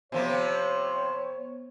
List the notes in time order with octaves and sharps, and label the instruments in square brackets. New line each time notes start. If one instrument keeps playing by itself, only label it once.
[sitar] C3 F3 A#3 [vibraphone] B3 C5 [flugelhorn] C#5